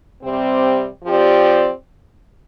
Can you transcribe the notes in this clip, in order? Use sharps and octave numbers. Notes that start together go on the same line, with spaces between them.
C3 G3 C4
F3 C4 G4 D5